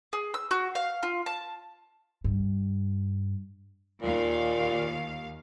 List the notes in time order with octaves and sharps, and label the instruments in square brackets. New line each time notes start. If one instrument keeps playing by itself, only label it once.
[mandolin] G#4
E6
F#4
F5
F4
A5
[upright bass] G2
[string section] D#2 F5 [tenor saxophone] A#2